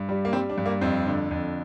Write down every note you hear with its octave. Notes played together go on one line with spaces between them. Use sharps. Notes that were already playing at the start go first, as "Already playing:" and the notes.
Already playing: G2
G3
A#3
G3 C4
D4
G2
A#3
F2 C4
D3
F2